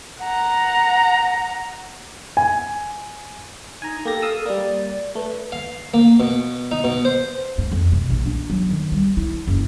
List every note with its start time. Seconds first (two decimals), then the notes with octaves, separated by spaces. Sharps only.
0.20 F#5 A#5
2.37 G#5
3.82 D#4 G#5 A#5
4.05 A#3 G4 A4 A#6
4.22 F5 D#6 E6
4.46 G3 A#3 D5
5.15 A3 B4
5.52 F5
5.94 A#3
6.20 B2
6.71 D#4
6.84 B2
7.05 C5
7.58 G#2
7.71 F2
7.92 C3
8.10 A#1
8.26 D4
8.50 F#3
8.70 D#3
8.92 G3
9.17 E4
9.47 F#1